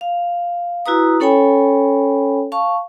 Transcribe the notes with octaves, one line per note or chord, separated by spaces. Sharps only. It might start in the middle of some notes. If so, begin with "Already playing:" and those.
F5
E4 F#4 B4 A#5 D#6
C#4 A4 C#5 G5 G#5 B5
F5 A5 C#6